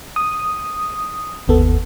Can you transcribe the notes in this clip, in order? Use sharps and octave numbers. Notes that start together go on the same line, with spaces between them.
D#6
G1 D#2 B3 A4